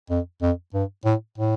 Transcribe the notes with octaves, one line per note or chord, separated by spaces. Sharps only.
F2
F2
G2
A2
A2